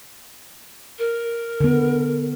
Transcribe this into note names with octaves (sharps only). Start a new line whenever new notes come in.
A#4
D3 B3